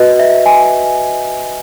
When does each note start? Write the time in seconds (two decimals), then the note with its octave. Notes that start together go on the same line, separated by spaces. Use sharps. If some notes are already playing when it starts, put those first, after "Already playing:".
Already playing: F#4 B4 D#5
0.19 E5
0.46 G#5